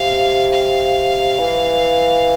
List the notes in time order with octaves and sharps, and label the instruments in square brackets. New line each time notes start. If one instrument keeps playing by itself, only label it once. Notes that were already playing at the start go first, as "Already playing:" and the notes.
Already playing: [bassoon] C3 [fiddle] F5
[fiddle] F5
[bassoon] E3